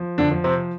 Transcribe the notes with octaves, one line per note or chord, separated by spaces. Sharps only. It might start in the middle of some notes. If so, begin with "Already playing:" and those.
Already playing: F3
D3 D4
F3
C3 C4